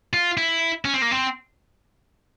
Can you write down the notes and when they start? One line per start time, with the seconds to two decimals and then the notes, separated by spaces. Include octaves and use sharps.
0.13 F4
0.37 E4
0.85 C#4
0.94 C4
1.02 A#3
1.11 C4